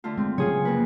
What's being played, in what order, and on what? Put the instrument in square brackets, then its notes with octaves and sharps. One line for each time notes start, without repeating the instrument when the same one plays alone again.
[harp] D3 A3 F4
[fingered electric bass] G#3 [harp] C4
[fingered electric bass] C#3 F3 F#3 [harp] F4 G#4 C#5
[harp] F2 A#3 B4